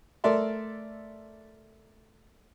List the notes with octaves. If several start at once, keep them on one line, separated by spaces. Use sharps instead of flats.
A3 A#4 D5 E5 C6